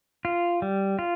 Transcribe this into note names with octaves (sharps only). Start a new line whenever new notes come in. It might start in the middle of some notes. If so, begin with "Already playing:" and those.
F4
G3
F4